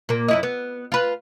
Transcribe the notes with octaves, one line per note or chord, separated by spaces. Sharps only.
A#2 A#3
F#2 E4 D#5
B3
F4 B4